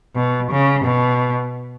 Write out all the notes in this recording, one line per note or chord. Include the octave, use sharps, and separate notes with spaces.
B2
C#3
B2